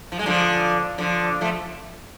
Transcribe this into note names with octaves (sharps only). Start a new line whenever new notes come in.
F3
G#3
D3 F3
D3 F3
F3 A3